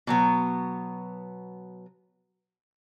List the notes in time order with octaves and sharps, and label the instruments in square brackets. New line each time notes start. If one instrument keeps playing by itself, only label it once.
[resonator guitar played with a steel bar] B2 F#3 B3